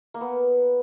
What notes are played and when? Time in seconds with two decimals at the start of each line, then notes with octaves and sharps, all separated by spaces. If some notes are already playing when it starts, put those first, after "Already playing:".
0.14 A#3
0.21 B3